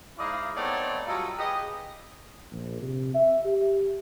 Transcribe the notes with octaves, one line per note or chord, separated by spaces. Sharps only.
G#2 E4 D5 D#5 F5
A3 B3 C4 D#4 C#5 D5
F#3 G3 F4 A4 A#4 D#5
G4 G#4 B4 D#5
A#1
C3
E5
G4